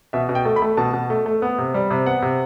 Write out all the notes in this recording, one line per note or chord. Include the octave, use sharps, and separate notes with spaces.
B2 E5
B2
G5
A3
B5
A3
B2 A5
B2
A3
A3
B3
C3
G3
C3
B3 F#5
C3